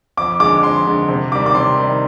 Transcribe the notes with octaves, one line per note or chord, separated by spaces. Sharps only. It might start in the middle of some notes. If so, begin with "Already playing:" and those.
F2 D6
D3 G#3 D6
F2 C6
D3 G#3
C3
D#3 G3 D6
D6
C3 C6
D#3 G3